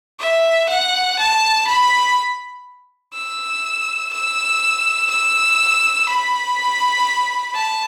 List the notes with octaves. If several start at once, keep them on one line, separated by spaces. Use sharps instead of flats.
E5
F#5
A5
B5
E6
E6
E6
B5
A5